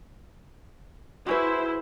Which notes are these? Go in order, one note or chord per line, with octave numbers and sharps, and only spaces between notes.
E4 F#4 G#4 B4 C5